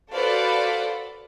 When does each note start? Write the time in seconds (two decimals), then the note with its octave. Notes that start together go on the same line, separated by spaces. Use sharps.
0.13 F#4 A4 B4 C5 D5 F5